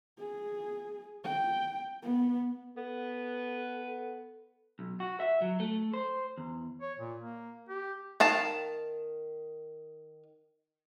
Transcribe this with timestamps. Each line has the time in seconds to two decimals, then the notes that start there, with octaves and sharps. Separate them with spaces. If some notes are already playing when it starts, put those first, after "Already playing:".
0.19 G#4
1.24 G5
2.02 B3
2.77 B3 A4
4.79 B1
5.00 F#4
5.20 E5
5.42 F#3
5.60 A3
5.94 C5
6.38 E2
6.81 C#5
6.99 A#2
7.19 A#3
7.69 G4
8.20 D#3 F5 A5